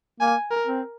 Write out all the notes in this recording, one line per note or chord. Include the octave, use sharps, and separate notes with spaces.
A#3 G#5
A#4
C4